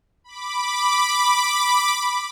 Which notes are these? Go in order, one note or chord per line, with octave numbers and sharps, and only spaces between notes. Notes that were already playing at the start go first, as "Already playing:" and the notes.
B5 D6